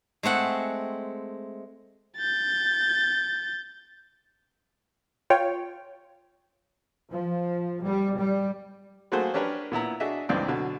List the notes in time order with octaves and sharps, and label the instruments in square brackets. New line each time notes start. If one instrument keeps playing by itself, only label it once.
[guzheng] G#3 A3 C4 F#5
[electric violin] G6 A6
[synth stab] F4 C#5 G5
[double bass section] F3
G3
G3
[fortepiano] F#3 A3 A#3 F#4 G#4 C5
C#4 D4 G4 A#4 B4 C#5
A#2 B3 E4 A#5
D4 F#4 G#4 D#5 E5
C#2 G2 E3 C4 D5
B2 D3 F#3